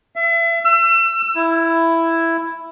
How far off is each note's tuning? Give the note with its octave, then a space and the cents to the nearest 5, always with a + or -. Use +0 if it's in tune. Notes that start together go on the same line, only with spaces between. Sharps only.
E5 +35
E6 +35
E4 +5